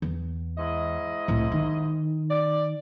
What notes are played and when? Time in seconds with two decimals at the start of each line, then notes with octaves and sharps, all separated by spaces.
0.02 E2
0.58 G#2 E4 D#5
1.28 C2 A2
1.52 D#3
2.29 D5